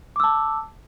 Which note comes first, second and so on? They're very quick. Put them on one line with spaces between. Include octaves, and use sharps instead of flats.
D6 E6 A5